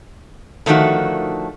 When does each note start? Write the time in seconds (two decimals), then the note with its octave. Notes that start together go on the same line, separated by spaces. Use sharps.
0.66 D3 D#3 F3 A3 F#4